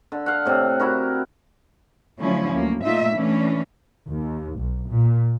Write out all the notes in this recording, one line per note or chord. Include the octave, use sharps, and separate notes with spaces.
D3
F5 F#5
A2 C3
E4 F#4 A#4
D3 F3 F#3 A3 C#4 E4
D2 F#3 A#3
A#2 A3 D#4 F4 E5
E3 A3 C#4 D4
D#2
B1
A#2